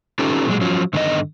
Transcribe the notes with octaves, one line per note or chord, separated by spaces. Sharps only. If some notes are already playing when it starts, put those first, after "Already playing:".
C#4 D#4 F4 G4 A4 B4
A#2 D3 F#3 G#3
F3 F#3 C#4
G2 D3 D#3 B3 G#4 D#5